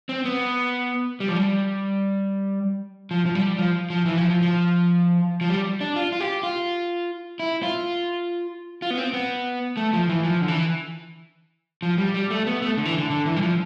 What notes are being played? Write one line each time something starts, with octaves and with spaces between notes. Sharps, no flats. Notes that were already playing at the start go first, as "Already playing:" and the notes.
C4
B3
G3
F3
G3
F3
F3
G3
F3
F3
E3
F3
F3
F3
F3
G3
D4
F4
F4
G4
F4
E4
F4
F4
B3
C4
B3
A3
F3
E3
F3
D3
E3
F3
G3
G3
A3
B3
A3
D3
E3
D3
D3
E3
G3
F3